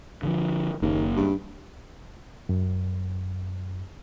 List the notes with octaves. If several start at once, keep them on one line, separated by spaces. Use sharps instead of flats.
D3 E3 F3
F#1 D#2 A#3
G2
F#2